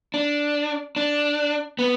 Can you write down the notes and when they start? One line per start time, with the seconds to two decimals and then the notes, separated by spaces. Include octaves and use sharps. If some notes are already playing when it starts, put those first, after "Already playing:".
0.14 D4
0.96 D4
1.79 B3